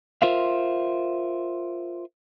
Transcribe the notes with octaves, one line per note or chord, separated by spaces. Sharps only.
F4 A#4 C5 E5 F5